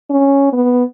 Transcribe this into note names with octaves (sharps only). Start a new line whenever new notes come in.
C#4
B3